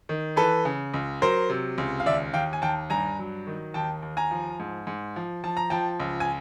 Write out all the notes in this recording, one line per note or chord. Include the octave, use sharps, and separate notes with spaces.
D#3
E3 A4 B4
C#3
C#2
F#3 A#4 C5
C3
C#2
F5
D#2 D5 E5
D#2 F5 G5
G#5
D#2 G5 A5
G2 G#5 A#5
F#3
D#3
D#2 G5 A5
D#2
G#5 A#5
F3
G#2
G#2
F3
F3 A5
A#5
F3 G5 A5
C#2
G#5